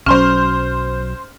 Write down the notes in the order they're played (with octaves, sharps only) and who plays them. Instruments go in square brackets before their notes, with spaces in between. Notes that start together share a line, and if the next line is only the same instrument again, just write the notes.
[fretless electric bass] B1 F#3 [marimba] C#4 [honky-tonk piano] C5 C6 F6